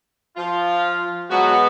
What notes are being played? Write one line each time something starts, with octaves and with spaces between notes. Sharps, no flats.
F3 F4
B2 F#3 G#3 B3 F#4